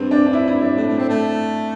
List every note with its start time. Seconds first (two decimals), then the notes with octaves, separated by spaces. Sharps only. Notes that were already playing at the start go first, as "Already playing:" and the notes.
Already playing: G2 C4
0.11 D4
0.26 D4
0.33 E4
0.48 E4
0.62 D4
0.77 A2
0.87 A2
0.98 C4
1.09 A3